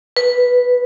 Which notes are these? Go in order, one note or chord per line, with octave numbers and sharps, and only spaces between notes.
B4